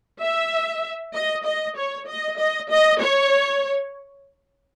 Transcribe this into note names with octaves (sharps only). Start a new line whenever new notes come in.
E5
D#5
D#5
C#5
D#5
D#5
D#5
C#5